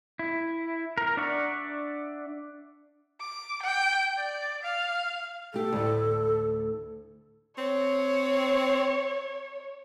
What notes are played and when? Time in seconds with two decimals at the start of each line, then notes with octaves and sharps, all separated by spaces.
0.19 E4
0.98 A#4
1.17 D4 D5 E5 F#5 C#6
3.20 D6
3.62 G5
4.18 D5
4.63 F5
5.54 A3 G4 A4
5.73 D2 A2
7.58 C4 C#5